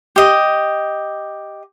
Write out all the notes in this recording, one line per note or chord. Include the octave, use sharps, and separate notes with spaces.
G4 D#5